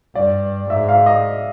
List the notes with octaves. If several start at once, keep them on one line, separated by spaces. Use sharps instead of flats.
G2 D5
G#2 E5
F5
D#5